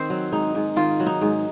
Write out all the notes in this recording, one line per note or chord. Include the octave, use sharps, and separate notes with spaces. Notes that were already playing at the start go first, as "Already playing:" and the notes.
Already playing: D#3 C4 C5
F#3
G#2 D#4
G#2
D#3 F4
F#3
D#4
G#2